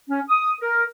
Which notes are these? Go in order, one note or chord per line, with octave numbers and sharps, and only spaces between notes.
C#4
D#6
A#4